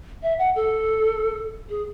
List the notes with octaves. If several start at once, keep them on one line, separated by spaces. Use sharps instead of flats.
E5
F#5
A4
G#4